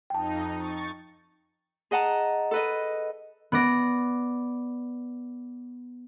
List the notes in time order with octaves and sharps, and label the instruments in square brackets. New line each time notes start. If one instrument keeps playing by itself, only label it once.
[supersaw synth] F2 D#4 [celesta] G5 A5
[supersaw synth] C#6 A6
[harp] G#4 D#5 F#5 A5 A#5
A4 B4 D#5
B3 D5 A#6